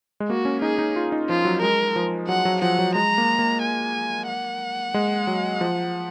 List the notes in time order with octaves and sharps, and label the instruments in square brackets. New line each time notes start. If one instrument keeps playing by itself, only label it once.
[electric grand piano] G#3
[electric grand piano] A#3 [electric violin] F#4
[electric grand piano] C#4
[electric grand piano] D#4 [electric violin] G#4
[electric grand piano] D#4
F4
D#4
[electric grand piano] F3 [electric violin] F4
[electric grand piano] F#3
[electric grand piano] G#3 [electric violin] A#4
[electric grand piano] F3
[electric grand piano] F#3 [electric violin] F#5
[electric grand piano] F#3
[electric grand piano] F3 [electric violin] F#5
[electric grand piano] F#3
[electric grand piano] G#3 [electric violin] A#5
[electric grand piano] A#3
A#3
[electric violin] G#5
F#5
[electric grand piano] G#3
F#3
F3